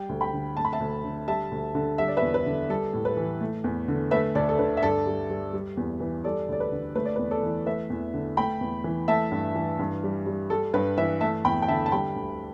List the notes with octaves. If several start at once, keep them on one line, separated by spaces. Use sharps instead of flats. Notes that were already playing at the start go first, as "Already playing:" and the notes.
Already playing: G3 G5
D2
G5 B5
D3
A3 A5
B5
E5 A5
D2
D3
G3 E5 A5
D2
D3
G3 E5
D5
B4 E5
E2
B4
D3
G3 A4
A2
B4
E3
A3
E2
D3
A3 B4 E5
D2 A4 D5
A4
D3 B4
E5
G2 A4 D5
G3
G3
G3
E2
E3
G3 A4 D5
D2 D5
B4
D3
A3 B4
D5
B4
E2
A4 D5
E3
A3 B4 E5
E2
D3
A3 G5 B5
E2
E3
A3 E5 A5
G2
E3
G2
G3
G3
G3 A4
G2 B4
E3 B4 E5
A3 E5 A5
E2 G5 B5
G5
D3 E5 A5
A5
G3 G5 B5
D2